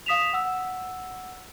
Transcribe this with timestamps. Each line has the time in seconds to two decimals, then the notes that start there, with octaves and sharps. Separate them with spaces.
0.06 F5 D#6 B6 E7 F7
0.33 F#5 E6